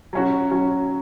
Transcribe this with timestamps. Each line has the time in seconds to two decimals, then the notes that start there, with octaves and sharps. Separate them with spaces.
0.13 F#3 C#4 F#4
0.51 F#3 C#4 F#4